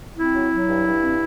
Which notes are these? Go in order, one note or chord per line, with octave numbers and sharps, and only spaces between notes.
C4 E4
F#3
F#3
G2
G2
C4